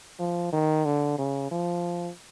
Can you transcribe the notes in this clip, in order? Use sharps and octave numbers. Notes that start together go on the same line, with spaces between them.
F3
D#3
D3
C#3
F3